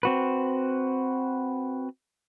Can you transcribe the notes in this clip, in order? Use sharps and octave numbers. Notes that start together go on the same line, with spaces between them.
C4 F#4 B4